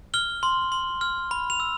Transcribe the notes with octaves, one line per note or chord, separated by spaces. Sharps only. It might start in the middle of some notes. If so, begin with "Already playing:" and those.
F6 G7
C6
C6
F6
B5
F7
E6